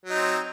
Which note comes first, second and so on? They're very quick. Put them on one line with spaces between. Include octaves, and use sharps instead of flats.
F#3 D#4 C4